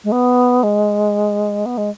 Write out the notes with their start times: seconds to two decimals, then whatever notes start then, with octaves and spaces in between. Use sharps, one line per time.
0.04 G#3
0.12 B3
0.63 G#3
1.66 B3
1.78 G#3